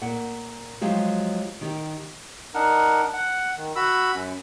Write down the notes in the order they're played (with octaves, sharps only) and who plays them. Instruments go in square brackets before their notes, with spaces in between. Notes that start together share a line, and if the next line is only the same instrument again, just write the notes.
[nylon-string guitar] A#2 F#5
F3 F#3 G#3 G4
D#3 G4
[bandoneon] D4 D#4 A#4 F#5
F#5
D#3
F#4 B5 E6
F#2